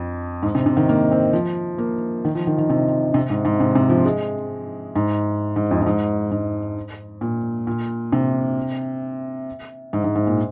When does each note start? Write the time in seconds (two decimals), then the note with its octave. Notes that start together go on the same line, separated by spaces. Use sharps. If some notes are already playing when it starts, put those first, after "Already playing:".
Already playing: F2
0.43 G#2
0.55 C3
0.66 C3
0.77 D#3
0.89 A#3
1.12 C4
1.33 F3
1.78 A#3
2.25 D#3
2.35 F3
2.47 D#3
2.58 D#3
2.70 C3
3.14 C3
3.30 G#2
3.45 G#2
3.60 C3
3.75 C3
3.89 F3
4.05 G#3
4.96 G#2
5.56 G#2
5.71 F2
5.82 F2
5.86 G#2
6.31 G#2
7.21 A#2
7.67 A#2
8.13 C3
9.93 G#2
10.04 G#2
10.16 G#2
10.27 A#2